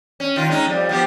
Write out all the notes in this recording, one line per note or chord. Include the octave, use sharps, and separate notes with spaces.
C#4
D#3 F4
G#3 C#4 D#4
F2 G3
F3 B3 G4